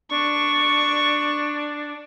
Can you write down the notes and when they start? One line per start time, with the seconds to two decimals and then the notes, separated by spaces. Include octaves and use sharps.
0.10 D4 C#6